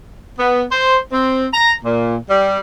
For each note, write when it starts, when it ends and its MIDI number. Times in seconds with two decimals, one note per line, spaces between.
0.40 0.63 59
0.72 0.98 72
1.12 1.47 60
1.54 1.73 82
1.84 2.16 46
2.30 2.59 55